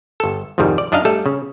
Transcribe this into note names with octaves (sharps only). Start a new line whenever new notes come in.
G1 A4
C2 F2 G#2 D#3 G3
D5
F#2 D4 D#4 D#5 F5
G3 A3 A4
C#3